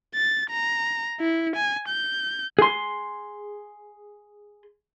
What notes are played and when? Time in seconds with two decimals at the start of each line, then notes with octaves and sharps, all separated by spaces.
0.15 A6
0.50 A#5
1.20 E4
1.56 G#5
1.88 G6
2.59 G#4 C6